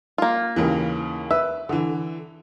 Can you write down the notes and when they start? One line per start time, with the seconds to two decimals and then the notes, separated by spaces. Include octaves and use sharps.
0.18 A#3 F4
0.56 D#2 C#3 E3
1.31 B4 E5
1.69 D3 E3